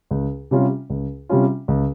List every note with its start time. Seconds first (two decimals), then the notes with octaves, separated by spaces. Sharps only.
0.11 C#2
0.51 C3 G3 C#4 F4
0.90 C#2
1.29 C3 G3 C#4 F4
1.68 C#2